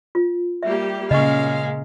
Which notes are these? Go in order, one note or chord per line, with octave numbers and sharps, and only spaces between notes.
F4
G3 A#3 G4 E5
A#2 C#3 G#3 D#5 F5 C#6